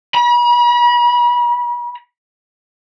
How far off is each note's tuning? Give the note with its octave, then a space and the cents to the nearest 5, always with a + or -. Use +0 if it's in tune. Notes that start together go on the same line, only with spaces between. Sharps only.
B5 -45